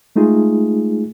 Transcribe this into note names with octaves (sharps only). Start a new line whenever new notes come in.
G#3 A3 D#4 F4 G#4